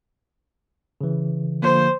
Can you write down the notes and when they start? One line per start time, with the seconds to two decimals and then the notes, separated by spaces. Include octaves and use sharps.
1.01 C#3 E3
1.63 D3 F3 A#3 C5